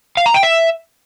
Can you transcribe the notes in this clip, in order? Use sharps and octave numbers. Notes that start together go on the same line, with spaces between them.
F5
A#5
G5
E5